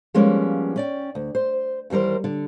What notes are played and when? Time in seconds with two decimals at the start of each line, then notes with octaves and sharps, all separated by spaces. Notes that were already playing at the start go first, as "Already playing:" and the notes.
0.14 F3 G3 G#3 A#3 B3 C#4
0.76 C#4 D5 G5
1.15 D2
1.35 C5
1.90 D#2 E3 G3 A#4 C5
2.24 D3